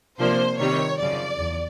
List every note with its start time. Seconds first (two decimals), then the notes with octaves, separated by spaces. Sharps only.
0.19 C3 F3 A#3 D4 C5
0.59 C3 D#3 G3 C4 C#5
0.99 F#2 C#3 F3 D5
1.39 E2